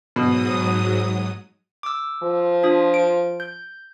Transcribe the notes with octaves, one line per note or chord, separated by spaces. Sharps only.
G#2 B2 F#3 D#6
D6 E6
F3
D4 F4 D#6
D7
G6